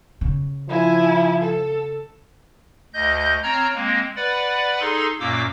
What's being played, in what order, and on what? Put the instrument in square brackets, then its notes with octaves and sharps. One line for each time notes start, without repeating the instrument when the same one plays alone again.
[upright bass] C#3
[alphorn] F3 [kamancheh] E4 G#5
[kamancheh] A4
[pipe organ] D2 D#5 G6
C4 C#5 A#5 F6
G#3 A#3 C4
B4 D5 F#5 B5 A6
D#4 G#4 A4 C6
F#2 A#2 A#3 D6 E6